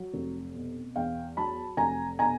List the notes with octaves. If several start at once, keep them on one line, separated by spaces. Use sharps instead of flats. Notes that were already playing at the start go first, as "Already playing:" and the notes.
Already playing: F#3
F1
B2
E2 F5 G5
F#3 A5 B5
F1 G#5 A#5
B2 G#5 A#5